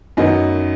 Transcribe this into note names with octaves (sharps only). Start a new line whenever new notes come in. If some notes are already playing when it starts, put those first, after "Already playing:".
F#2 D#3 F#3 B3 D#5